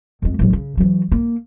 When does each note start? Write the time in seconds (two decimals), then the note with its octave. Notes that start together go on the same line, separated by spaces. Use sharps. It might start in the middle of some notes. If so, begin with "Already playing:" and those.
0.22 F2 G#3
0.39 A1 F#3
0.53 C#3
0.77 E3 F#3
1.12 A#3